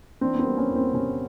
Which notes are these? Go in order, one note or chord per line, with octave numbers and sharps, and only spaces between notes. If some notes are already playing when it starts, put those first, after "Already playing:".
E3 C4 D4
B3
A#3 C4
G3
B3 C#4
E2
A#3 C4
C3 B3 C#4